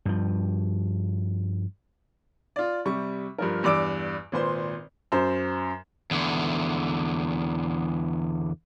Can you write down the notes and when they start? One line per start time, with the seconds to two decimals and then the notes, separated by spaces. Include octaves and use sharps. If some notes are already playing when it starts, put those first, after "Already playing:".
0.05 G2 F3
2.56 F4 D5
2.85 C3 G3 C#6
3.38 G2 F3 A#4
3.63 E2 G2 D5 D6 E6 D7
4.32 G#1 A#2 B4 C5 C6
5.12 F#2 C5
6.11 E2 D3